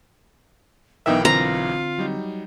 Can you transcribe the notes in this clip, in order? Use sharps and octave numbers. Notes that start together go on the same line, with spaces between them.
B1 E3 B3 D#4 A#4 E5 G5
D3 C4 F4 A#5
F#3 G3 D#4